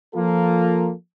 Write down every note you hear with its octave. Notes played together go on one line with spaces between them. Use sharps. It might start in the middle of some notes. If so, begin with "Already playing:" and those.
F3 A#3 F4 A4